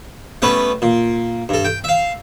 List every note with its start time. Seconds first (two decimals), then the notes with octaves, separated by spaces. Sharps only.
0.42 G3 A3 B3 C#4 B4
0.82 A#2
1.49 G2 A4
1.65 G5
1.84 E5 F5